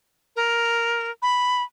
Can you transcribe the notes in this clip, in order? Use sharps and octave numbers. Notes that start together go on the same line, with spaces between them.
A#4
B5